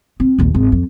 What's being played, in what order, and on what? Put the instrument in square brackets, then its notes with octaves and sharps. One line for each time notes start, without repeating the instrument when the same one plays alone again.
[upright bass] C4
A#1 D#2
G#1
F2